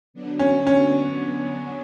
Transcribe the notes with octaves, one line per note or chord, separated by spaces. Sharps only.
D3 F#3 B3 D4
C#4
C#4